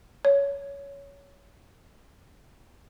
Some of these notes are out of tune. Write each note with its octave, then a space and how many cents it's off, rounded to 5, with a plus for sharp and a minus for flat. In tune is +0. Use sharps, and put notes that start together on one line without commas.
C#5 +15